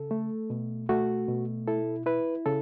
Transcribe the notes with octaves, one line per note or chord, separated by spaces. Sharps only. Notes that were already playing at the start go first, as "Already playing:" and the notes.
Already playing: C#3 A4
A3
B2
A3 F#4
B2
E4 A4
E4 B4
C#3 A4